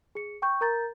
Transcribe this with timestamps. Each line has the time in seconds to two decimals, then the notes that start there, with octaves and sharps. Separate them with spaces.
0.15 G#4 C#7
0.42 G5 C#6 G6
0.61 A#4 A#5 G6 A6